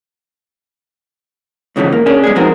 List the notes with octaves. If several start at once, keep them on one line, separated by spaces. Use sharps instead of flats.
G#2 C#3 E3 F3 A3
A#3
C#4 D4 G#4
G#3 B3 G#4
F3 G#3 C4 D#4 F#4 A#4